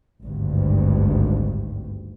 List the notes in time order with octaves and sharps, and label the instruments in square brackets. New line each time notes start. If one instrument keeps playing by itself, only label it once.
[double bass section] G#1 D2 G2